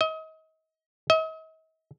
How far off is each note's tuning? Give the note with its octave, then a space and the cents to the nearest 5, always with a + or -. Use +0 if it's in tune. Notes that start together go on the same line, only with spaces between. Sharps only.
D#5 +35
D#5 +45